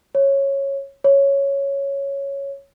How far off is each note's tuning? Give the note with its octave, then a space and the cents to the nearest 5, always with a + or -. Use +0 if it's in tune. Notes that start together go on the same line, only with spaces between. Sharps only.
C#5 -10
C#5 +0